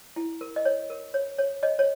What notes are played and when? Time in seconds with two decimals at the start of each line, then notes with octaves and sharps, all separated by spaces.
0.16 E4
0.41 A#4
0.56 D#5
0.65 C#5
0.90 A#4
1.14 C#5
1.38 C#5
1.63 C#5 D#5
1.79 C#5